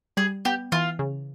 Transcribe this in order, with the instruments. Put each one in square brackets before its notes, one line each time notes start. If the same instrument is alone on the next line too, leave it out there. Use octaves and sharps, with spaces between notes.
[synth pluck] G3 [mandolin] G#4
[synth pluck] B3 [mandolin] G4
[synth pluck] E3 [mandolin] F4
[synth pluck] C#3